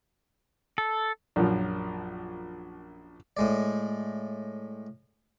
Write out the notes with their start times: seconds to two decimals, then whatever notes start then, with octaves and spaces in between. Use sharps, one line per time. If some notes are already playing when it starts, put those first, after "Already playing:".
0.78 A4
1.36 A#1 F#2 F3
3.37 A2 G#3 D5